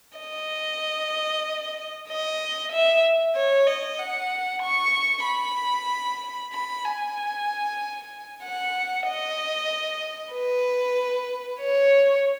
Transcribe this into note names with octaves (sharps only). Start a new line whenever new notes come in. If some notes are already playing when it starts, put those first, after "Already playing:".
D#5
D#5
E5
C#5
D#5
F#5
C#6
B5
B5
G#5
F#5
D#5
B4
C#5